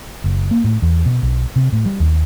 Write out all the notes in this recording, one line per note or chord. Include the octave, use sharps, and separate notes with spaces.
F#1
A#3
A2
E2
B2
B1
C3
A2
G3
D#2